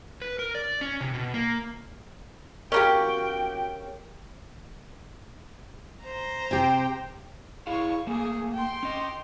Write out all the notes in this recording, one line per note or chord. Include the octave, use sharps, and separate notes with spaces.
B4
A#4
D5
C#4
C3
B2
A#3
C#4 D#4 F#4 G4 A#4 F5 G5
C5 A#5
C3 G4 G5
E4 G#4 C#5 F5 C#6
A3 A#3 G#4
G5 C6
C#4 D#5